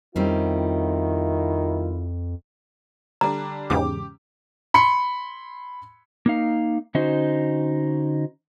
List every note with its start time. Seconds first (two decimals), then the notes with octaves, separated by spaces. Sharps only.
0.16 F2 D#3 G3 C4 C#4 E4 F4
3.21 D3 G3 D4 A#5
3.70 E2 G#2 C#3 G4 D6
4.74 B5 C6 C#7
6.26 A#3 D#4 F5
6.95 D3 C#4 D#4 F#4 C5